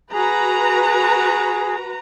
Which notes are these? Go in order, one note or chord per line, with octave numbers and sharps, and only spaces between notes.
F#4 G#4 B4 A#5